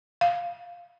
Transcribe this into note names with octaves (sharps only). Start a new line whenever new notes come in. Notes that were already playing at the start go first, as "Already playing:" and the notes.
F5